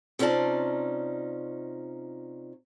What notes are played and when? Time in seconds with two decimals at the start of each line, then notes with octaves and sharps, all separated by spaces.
0.19 C3 C#4 D#4 F4 D5 A5